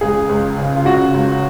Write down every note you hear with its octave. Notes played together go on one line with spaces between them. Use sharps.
C#2 G#4
C#2
C#3
F4
C#3 F#4
C#2